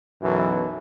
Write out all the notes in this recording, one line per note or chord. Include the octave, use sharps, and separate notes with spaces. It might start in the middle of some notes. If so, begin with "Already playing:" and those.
B1 F#2 B2 E3